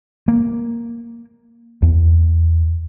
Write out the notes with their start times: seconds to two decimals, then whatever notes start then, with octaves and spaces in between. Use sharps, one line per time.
0.28 A#3
1.82 E2